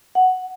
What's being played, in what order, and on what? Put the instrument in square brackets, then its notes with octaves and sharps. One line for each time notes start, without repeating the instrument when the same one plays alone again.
[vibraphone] F#5